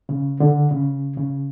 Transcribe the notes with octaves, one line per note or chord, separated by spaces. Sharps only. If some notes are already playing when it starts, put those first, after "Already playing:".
C#3
D3
C#3
C#3